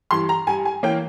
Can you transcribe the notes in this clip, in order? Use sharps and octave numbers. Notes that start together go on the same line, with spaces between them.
G2 E3 C6
A#5
G2 G#5
G#5
E3 A#3 C#4 G5